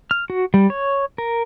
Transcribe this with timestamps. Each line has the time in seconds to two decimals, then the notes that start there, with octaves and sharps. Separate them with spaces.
0.11 F6
0.30 F#4
0.54 G3
0.70 C#5
1.18 A#4